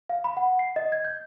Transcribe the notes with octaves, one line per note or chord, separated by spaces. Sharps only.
F5
B5
F#5
C7
D#5
G#6
G6